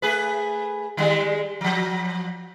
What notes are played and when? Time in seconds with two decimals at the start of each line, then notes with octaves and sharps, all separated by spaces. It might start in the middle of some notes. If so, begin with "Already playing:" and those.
0.02 A3 G#4 B4
0.97 D#3 G3 G#3
1.61 F3 F#3